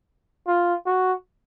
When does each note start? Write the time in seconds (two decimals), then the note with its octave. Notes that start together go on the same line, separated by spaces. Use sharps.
0.47 F4
0.86 F#4